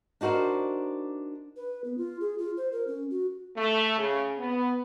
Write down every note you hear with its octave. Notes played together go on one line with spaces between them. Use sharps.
D4 D#4 F#4 A#4 C5
B4
B3
F4
G#4
F4
C5
A#4
C#4
F#4
A3
C#3
B3